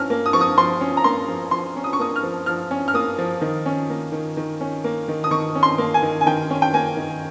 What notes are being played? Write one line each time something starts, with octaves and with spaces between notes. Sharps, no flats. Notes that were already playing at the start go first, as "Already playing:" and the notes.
Already playing: F3 C#4 F6
A#3
D#6
F3 C#6
D#6
F3 C6
C#4
A#5
A#3 C6
F3
F3 C6
C#4
D#6
C#6
A#3 D#6
F6
F3
F3 F6
C#4
F6
A#3 D#6
F3
D#3
C#4
A#3
D#3
D#3
C#4
A#3
D#3
D#6
D#3 C#6
C#4
C6
A#3
G#5
D#3
G#5
D#3 G5
C#4
G5
A#3 G#5
D#3